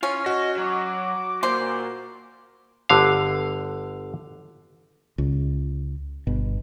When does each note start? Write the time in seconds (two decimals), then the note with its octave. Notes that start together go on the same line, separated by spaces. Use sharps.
0.03 C#4 F4
0.26 F#4 D#5
0.57 F#3 D6
1.43 A#2 C5
2.89 G1 D3 F5
5.18 C#2
6.27 G1 B2